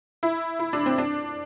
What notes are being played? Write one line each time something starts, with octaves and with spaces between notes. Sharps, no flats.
E4
E4
D4
C4
D4